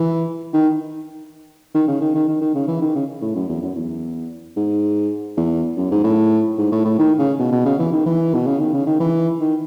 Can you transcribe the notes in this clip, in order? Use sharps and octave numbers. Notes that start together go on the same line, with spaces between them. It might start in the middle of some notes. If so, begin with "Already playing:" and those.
Already playing: E3
D#3
D#3
C#3
D#3
D#3
D#3
D#3
C#3
E3
D#3
C#3
A2
F#2
E2
F#2
E2
G#2
E2
F#2
G#2
A2
G#2
A2
A2
D#3
C#3
B2
B2
C#3
E3
D#3
E3
B2
C#3
D#3
C#3
D#3
E3
D#3